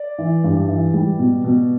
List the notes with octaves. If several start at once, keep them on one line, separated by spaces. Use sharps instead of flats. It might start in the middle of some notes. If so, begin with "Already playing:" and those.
Already playing: D5
E3
G2
E3
G3
B2
B2